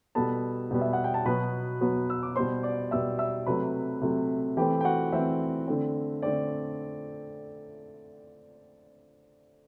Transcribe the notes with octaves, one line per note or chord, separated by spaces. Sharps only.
B2 G3 B3 A4 A5
B2 G3 B3
E5
F#5
G5
A5
B2 F#3 B3 B4 B5
B2 F#3 B3
E6
D6
B2 G3 B3 C5 C6
D5 D6
B2 G3 B3 E5 E6
E5 E6
C3 F#3 A3 B4 B5
C3 F#3 A3
E3 A3 C4 G4 G5
G5
F#4 F#5
E3 A3 C4 E5
D3 A3 C4
D3 A3 C4 D5